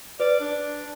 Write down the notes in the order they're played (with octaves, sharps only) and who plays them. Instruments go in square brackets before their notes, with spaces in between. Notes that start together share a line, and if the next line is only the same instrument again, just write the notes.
[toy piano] B4 [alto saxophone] D5
[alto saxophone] D4